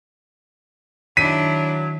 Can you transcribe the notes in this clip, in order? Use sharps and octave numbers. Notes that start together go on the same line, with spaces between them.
D#3 F#3 D4 E4 B6 D#7